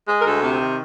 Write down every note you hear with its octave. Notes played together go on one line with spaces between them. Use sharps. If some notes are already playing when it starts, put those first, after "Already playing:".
G#3
A#4
D2 A4
C3
D#3